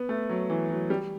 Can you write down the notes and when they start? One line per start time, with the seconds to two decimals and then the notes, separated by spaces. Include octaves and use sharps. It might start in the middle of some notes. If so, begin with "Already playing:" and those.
Already playing: B3
0.09 A3
0.29 F#3
0.50 E3
0.70 F#3
0.90 G3